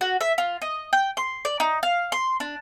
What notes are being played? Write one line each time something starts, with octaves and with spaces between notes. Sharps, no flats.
F#4
E5
F4
D#5
G5
C6
D5
D#4
F5
C6
D4